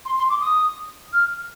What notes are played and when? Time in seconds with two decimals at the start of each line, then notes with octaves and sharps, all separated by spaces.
0.05 C6
0.17 C6
0.29 D6
0.41 D#6
1.13 F6